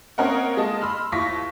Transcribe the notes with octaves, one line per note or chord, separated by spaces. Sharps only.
A#3 C4 C#4 A#4 D#5 F#5
G#3 A#3 D#5 A5
B5 C6 E6 F6
D#2 E4 F4 C#6 A#6 B6